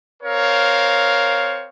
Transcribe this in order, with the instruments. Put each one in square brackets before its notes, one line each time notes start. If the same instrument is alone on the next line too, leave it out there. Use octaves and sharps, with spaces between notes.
[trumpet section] C4 A#4 C#5 F5